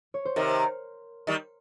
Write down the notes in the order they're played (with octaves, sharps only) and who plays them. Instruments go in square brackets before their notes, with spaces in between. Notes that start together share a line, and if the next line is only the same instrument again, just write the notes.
[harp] C#5
C5
[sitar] C3 D#3 [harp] A#4
[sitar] D#3 G3